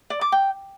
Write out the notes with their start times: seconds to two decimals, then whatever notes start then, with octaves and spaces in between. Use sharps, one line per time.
0.10 D5
0.21 D6
0.32 G5